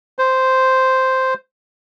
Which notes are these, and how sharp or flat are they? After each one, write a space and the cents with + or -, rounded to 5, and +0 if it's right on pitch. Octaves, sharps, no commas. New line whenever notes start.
C5 -5